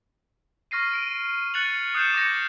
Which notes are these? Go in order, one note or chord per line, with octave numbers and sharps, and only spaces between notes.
C#6 F6 A#6 C7 D#7
A#6 D7 D#7
F#6 A6 C#7 D#7 F7 F#7
D#6 F#6 G6 C7 C#7 E7
D6 G6 A#6 C#7